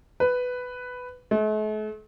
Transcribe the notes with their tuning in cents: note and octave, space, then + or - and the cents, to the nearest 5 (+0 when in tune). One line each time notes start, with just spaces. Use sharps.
B4 +10
A3 -45